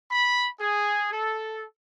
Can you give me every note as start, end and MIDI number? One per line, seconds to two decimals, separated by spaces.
0.11 0.47 83
0.60 1.10 68
1.13 1.64 69